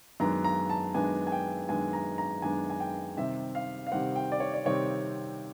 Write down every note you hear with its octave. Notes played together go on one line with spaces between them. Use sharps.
F#2 D#3 G#3 B3 D4 A#5
A#5
A5
F#2 D#3 G#3 B3 D4 G#5
G#5
G5
F#2 D#3 G#3 B3 D4 G#5
A#5
A#5
F#2 D#3 G#3 B3 D4 G#5
G#5
G5
C3 D#3 G3 C4 E5
F5
F5
C3 D#3 G3 C4 F#5
G5
D5
C#5
D5
C3 D#3 G3 C4 C#5